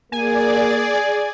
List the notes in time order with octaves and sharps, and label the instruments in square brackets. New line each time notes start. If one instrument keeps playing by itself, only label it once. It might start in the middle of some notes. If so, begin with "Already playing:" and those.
[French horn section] A#3 [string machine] G#4 D5 [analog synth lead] G#5